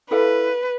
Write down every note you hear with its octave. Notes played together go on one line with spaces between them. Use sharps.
E4 A4 B4 D5 F5